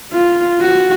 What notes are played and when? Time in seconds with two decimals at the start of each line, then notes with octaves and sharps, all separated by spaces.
0.13 F4
0.61 F#4